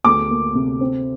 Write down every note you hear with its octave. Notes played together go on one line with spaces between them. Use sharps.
D2 D6
A#3
C3
C4